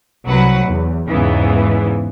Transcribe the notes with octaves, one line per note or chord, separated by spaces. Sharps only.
C2 F#3 B4 F#5
E2
E2 G#2 C#3 E3 B3